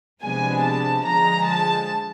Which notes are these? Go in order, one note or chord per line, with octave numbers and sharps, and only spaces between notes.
C3 F3 G#3 B3 D4 G#5
A5
D3 F3 G#3 A#5
A5